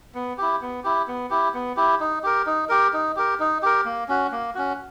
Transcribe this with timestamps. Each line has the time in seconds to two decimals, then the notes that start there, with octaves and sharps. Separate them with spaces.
0.15 B3
0.38 E4 G4
0.62 B3
0.84 E4 G4
1.08 B3
1.30 E4 G4
1.54 B3
1.77 E4 G4
2.00 D#4
2.24 G4 A#4
2.46 D#4
2.69 G4 A#4
2.93 D#4
3.16 G4 A#4
3.40 D#4
3.63 G4 A#4
3.85 A#3
4.08 C#4 F#4
4.32 A#3
4.55 C#4 F#4